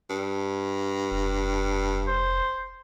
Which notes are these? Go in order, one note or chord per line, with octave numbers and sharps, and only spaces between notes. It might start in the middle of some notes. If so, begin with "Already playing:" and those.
G2
F1
C5